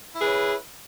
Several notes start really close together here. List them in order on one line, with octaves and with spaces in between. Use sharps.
E4 G#4 B4 C#5